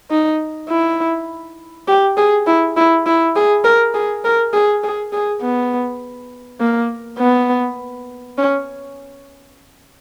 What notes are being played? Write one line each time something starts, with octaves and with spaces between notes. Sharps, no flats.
D#4
E4
G4
G#4
E4
E4
E4
G#4
A#4
G#4
A#4
G#4
G#4
G#4
B3
A#3
B3
C#4